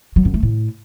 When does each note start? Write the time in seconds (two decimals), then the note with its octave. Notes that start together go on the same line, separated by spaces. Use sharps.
0.16 F#3
0.25 F#2
0.34 A3
0.43 A2